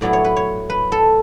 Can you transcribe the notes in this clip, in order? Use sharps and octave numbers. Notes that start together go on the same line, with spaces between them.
A2 F#3 B3 E4 D5
C#5
B4
C#5
B4
A4